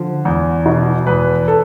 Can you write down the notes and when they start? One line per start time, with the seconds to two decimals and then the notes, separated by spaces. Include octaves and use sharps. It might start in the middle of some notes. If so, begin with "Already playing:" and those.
Already playing: D3 F3
0.25 E2
0.66 B2
1.07 E2 B4
1.48 A4